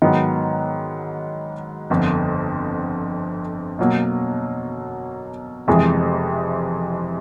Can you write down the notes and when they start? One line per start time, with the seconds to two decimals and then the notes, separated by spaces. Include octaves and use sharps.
0.02 G#2 D#3 F#3 B3
1.90 G1 F2 D3
3.79 B2 F#3 A#3
5.67 F1 F2 C3 E3 G#3